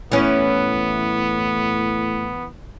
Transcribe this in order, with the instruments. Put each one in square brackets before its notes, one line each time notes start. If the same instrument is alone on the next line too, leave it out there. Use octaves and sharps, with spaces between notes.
[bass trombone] A2 [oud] E3 C#4 [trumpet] B3